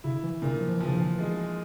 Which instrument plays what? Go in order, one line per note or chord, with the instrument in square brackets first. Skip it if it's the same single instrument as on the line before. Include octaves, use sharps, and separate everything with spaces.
[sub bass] C#3 [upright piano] E4
[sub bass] E3
[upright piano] A#2 [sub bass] C#3
[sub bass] F3
E3
[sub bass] C#3 [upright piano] F3
[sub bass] E3
[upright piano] G#3